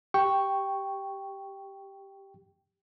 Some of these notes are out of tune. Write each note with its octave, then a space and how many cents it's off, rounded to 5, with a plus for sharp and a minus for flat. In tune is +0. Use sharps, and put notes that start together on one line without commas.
G4 +0 G5 +0 C#6 +0